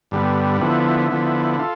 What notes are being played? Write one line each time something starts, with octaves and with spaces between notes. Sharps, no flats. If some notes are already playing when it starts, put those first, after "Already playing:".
G2 D3 G3 B3
D3 F3 B3 E4
D3 F3 B3 E4
F4 A4